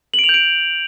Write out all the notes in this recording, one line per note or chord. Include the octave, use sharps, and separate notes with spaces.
F#7
D7
F7
G6
D7